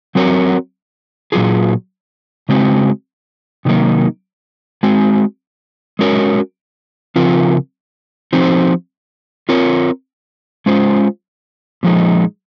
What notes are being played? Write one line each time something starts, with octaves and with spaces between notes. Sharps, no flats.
F#3 C4 F#4 A#4 C#5
A#2 F#3 A#3 F4 G#4
C#3 G#3 C4 F#4
C3 D#3 F#3 A#3 D#4
G#3 C4 F#4
G#3 C#4 F#4 A#4 C#5
C#3 F3 C4 F4 A#4
F3 C4 D#4 F#4 C5
C4 F4 A#4 C#5
G#3 C#4 F4 C5
A#2 F3 G#3 D#4